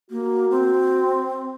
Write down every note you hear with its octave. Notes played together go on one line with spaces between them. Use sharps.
A#3 F#4
C4